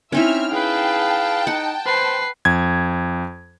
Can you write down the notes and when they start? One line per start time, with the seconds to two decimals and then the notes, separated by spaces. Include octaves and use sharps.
0.12 C4 C#4 D#4 E4 E5 F6
0.52 G#4 B4 F5 G5 A5
1.47 D#4 F#5
1.86 B4 C5 C7
2.45 F2 G#6